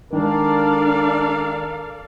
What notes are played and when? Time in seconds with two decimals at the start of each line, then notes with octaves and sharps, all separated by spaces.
0.13 D#3 G#3 D4 A4 A#4 D5 F5